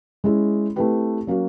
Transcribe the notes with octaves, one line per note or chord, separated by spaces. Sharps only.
G#3 C#4 E4 G#4
A3 C4 E4 G4 B4
F#3 A#3 C#4 F#4